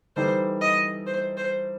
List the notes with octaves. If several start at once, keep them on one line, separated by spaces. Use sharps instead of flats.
E3 G3 D#4 A4 C5
D#5
C5
C5